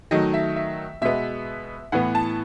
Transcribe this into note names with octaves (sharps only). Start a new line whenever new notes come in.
D#3 F#3 A3 D#5
E5
E5
B2 G#3 B3 E5
A2 E3 B3 F#5
A5